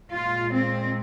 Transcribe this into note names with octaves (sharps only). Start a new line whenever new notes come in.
A#2 G#3 F4
C4